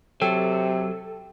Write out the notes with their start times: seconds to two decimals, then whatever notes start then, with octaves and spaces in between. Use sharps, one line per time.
0.22 C3 F#3 A4 G5